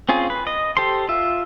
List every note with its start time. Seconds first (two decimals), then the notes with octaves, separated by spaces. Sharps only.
0.09 C4 C#4 F4 G#4
0.30 B4
0.47 D#5
0.77 G4 A4 C5 C6
1.09 F4 E5